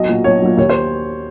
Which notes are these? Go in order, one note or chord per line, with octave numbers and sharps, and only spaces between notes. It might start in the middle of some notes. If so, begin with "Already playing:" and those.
Already playing: B1 D#5
A#2 F#3
B1 C#5
A#2 F#3
D#2 C#5
C5